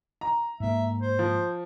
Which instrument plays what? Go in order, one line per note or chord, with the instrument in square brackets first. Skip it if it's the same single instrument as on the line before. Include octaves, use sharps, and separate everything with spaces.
[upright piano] A#5
[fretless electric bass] G#2 A#3 [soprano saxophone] E5
[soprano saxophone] C5
[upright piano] F3